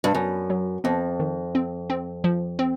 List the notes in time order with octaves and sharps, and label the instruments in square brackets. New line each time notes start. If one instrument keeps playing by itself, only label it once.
[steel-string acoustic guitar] G2
[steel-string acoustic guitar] F#2 [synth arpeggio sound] B3
[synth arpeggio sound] F#3
[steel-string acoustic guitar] F2 [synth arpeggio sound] B3
[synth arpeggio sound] D#3
C4
C4
F3
C4